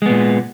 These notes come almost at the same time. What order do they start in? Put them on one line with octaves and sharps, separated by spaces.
G#3 B3 A#2